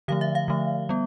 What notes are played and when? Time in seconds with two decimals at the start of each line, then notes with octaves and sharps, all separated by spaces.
0.08 D3 F3 A3 F5
0.21 E5
0.35 F5
0.48 D3 F3 A3
0.89 G3 B3